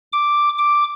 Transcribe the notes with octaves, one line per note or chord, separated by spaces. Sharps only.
D6
D6